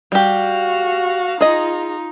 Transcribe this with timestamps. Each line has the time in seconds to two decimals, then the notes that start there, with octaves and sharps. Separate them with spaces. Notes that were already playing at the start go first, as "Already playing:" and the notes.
0.12 G3 F#4 G4 F5
1.41 D#4 F4 G#4 D#5